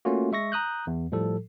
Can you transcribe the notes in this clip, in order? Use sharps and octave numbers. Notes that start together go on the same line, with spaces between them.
A3 A#3 C#4 F4 F#4
G#3 E5 C#6 A#6
A#5 D#6 F#6 G6
E2
A2 F3 G3 A4